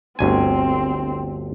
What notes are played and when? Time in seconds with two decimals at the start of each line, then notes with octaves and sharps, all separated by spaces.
0.19 G1 D2 C4 G#5